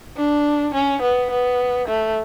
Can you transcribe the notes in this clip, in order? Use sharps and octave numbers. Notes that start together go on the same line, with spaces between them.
D4
C#4
B3
B3
A3